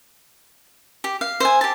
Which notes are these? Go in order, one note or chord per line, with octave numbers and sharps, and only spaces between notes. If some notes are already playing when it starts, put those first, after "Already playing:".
G4
F5
C5 E5 G#5
G4 A5